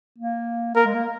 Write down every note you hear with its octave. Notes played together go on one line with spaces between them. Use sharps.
A#3
A#3 A#4
G#3
A#3